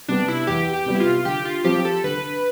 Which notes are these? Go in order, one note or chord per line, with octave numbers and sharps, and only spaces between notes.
C3 G3 B3 D4
E4
E2 G4
G4
C3 G3 B3
E4
F4
D3 G4
F4
F3 C4 F4 G4
A4
D3 B4